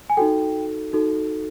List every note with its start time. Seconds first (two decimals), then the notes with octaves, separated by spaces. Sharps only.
0.10 G#5
0.17 D#4 F#4 A4 G5
0.93 D#4 F#4 A4